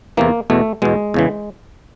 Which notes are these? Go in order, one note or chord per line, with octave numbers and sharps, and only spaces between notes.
E2 C3 E3 A#3
E2 B2 A3
E2 B2 G#3
E2 C#3 E3